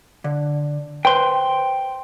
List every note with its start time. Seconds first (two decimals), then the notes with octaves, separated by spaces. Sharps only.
0.24 D3
1.05 B4 C5 G5 C6